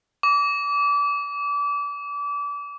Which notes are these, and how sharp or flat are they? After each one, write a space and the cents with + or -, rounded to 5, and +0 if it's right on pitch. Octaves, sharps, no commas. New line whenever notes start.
D6 -30